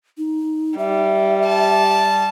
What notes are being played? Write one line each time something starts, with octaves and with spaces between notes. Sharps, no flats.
D#4
G3 E5
A5